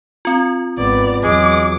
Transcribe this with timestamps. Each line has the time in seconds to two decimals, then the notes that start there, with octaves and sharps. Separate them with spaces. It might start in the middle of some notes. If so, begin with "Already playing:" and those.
0.25 C4 F4
0.78 G#1 B3 D5
1.23 E2 F#3 G#3 D6